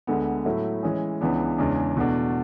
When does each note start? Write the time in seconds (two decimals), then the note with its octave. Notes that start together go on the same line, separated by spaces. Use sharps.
0.07 D2 D3 G#3 B3
0.45 A2 F#3 A3 E4
0.83 E3 G#3 C#4 G#4
1.21 C#2 C#3 E3 B3 D4
1.58 E2 C#3 G#3 D4
1.96 E2 B2 A3 D4 F#4